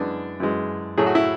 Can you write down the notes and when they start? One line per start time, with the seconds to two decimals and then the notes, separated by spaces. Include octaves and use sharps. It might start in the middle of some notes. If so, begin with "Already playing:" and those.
Already playing: F#2 E3 G#3 B3 D4
0.40 F#2 E3 G#3
0.98 A2 F#3 A3 G#4
1.06 F#4
1.15 E4